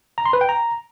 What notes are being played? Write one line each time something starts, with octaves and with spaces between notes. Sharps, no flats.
A#5
C6
B4
G5
A#5